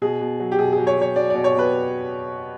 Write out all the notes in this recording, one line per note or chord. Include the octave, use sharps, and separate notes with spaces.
B2 G#4
B2
F#3
G4
B2 G#4
G#4
F#3
C#5
F#3 C#5
F#3 D5
B2 D5
C#5
B2 B4